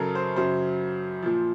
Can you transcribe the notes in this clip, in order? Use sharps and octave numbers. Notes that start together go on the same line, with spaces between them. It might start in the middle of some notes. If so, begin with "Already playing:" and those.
Already playing: F#2 C#3 F#3 A4 A#4
C5
F#2 C#3 F#3 C5
A#2 F3